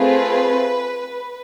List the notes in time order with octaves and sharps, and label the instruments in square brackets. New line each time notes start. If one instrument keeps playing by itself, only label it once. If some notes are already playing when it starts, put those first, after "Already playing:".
Already playing: [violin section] A3 C4 F4 G#4 B4